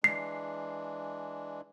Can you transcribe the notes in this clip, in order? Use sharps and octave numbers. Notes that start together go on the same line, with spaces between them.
E3 G#3 D4 C7